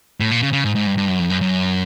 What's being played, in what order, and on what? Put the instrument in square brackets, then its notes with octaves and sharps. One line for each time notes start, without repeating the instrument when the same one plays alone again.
[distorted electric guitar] A2
A#2
C#3
C#3
G#2
G#2
G2
G2
F#2
F2
F#2
F#2